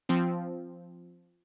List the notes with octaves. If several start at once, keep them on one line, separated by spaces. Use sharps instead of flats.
F3 C4